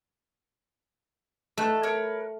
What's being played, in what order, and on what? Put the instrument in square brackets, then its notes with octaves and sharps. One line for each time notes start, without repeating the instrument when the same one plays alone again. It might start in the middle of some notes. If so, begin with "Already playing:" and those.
[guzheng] A3 [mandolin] D#4 A4 F#6
[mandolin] A#4 B4 C#5